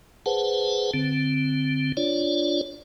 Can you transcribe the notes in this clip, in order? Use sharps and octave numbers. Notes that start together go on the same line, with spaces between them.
G#4 B4 C5 F#5 A5
D3 C4
D4 F4 C#5 D5